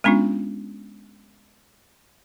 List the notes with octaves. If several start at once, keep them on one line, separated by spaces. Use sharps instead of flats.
G#3 B3 C#4 D4 F4